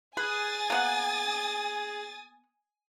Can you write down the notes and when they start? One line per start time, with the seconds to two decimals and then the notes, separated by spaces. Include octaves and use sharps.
0.17 G#4 B4 G#5 D#6 A6
0.70 A#3 B3 F#5